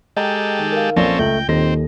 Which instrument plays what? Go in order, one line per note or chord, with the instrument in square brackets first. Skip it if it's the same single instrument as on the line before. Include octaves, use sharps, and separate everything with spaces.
[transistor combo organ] G#3 G4 A4 [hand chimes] D#5 G5 A#5
[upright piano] D#3
[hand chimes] A#4 F5
[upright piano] A#1 D5 G7 [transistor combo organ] C4 C#4 A4 [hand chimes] A#6
[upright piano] C#2 F#7 [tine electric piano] A3 [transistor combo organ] G5
[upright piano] D#1 D#4 A#6 [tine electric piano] D#2 [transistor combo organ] C4 [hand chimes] A4